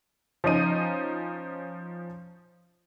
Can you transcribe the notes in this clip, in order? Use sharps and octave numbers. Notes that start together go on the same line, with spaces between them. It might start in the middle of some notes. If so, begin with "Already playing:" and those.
F3 C#4 D#4 D#7